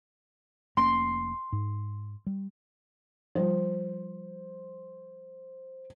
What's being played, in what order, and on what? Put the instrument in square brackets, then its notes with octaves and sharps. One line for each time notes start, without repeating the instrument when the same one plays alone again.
[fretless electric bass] F1 A#3 C#4 [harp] C6
[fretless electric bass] G#2
G3
[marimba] F3 G3 F4 [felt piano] C5